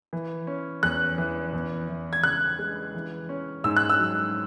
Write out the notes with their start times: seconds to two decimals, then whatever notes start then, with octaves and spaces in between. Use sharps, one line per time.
0.13 E3
0.47 C#4
0.83 E2 F#6
1.18 E3
1.53 E2
1.89 E3
2.13 G#6
2.23 C#3 F#6
2.59 G#3
2.95 E3
3.29 C#4
3.64 G#2 E6
3.77 F#6
3.90 E6
3.99 F#3